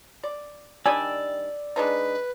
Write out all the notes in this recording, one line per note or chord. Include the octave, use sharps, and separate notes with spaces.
D5
D#3 G3 D4 D5 G#5 E6
G#3 D4 D#4 B4